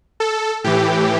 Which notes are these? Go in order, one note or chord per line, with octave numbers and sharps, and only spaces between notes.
A4
A2 E3 G4